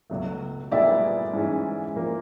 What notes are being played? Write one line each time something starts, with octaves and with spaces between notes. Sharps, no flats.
C#2 B2 F#3 A3
A#2 G3 B3 E4 G#4 D5 E5
G#2 E3 G#3 C#4
A#2 F3 A#3